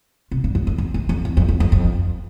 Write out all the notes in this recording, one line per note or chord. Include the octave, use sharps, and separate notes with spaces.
C3
G2
F#2
F2
F2
F#2
F2
E2
F2
F2
F2
F2